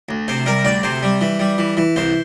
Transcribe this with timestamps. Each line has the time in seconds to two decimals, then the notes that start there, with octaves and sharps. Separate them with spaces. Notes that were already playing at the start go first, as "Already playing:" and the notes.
0.09 D2
0.28 C3 C5
0.46 G3 A#4
0.65 D2 D5
0.83 C3 C5
1.03 G3
1.21 E3
1.39 G3
1.58 E3
1.77 E3
1.96 C2 C5